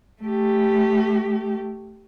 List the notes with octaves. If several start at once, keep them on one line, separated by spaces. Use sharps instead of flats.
A3 G4